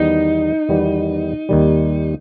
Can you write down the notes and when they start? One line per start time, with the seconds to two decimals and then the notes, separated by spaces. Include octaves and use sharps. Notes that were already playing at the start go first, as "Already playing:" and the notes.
Already playing: E2 D#3 G3 B3 D#4
0.69 E2 D#3 G3 B3
1.49 D#2 D#3 G3